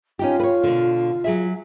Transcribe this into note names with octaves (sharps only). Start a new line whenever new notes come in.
C#4 D#4 F4 G4
B4 C#5
B2 D3
F#3 G#4 E5